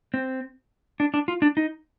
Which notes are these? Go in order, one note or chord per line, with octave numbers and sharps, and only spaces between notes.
C4
D4
D4
F4
D4
D#4